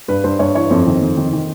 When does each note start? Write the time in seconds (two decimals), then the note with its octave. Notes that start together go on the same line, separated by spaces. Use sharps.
0.08 G2 B4
0.24 G2 C5
0.39 G2 C#5
0.55 E3 C#5
0.70 F2 C5
0.87 D#3
1.01 F2
1.17 D#3
1.33 D#3